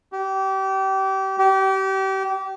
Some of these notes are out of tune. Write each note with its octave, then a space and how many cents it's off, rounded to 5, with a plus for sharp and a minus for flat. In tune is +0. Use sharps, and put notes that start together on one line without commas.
G4 -30
G4 -30